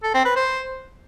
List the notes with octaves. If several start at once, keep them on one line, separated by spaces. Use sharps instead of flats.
A4
C4
B4
C5